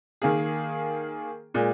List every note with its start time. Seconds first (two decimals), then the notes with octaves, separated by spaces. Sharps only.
0.22 D#3 A#3 G#4
1.54 A#2 G#3